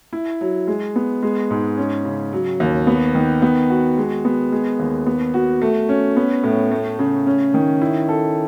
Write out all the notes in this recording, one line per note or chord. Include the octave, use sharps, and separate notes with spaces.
E4
F#3
G#3
B3
G#3
G#2
C#4
C#3
F#3
D#2
B3
D#3
B3
F#4
G#3
B3
G#3
D#2
B3
F#4
A3
C#4
B3
A2
A3
C#3
C#4
D#3
E4
A4